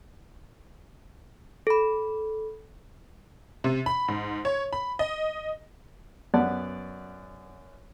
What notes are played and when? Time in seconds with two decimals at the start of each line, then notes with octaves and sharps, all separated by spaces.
1.67 A4 B5
3.64 C3
3.86 B5
4.08 G#2
4.45 C#5
4.73 B5
4.99 D#5
6.34 F#2 B3 D5 F#5